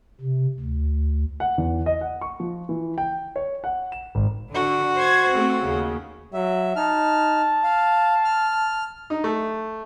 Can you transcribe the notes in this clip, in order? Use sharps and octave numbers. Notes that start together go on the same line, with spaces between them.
C3
D2
F#5
E2
D#5
F#5
C#6
F3
E3
G5
C#5
F#5
E7
G#1
D3 F#4
C5 G#6
A3 C4
D#2 C#3
F#3 E5
D#4 A5 F6
F5
F6
D#4
A3